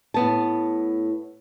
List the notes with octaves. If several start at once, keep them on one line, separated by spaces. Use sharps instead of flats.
A2 B3 A5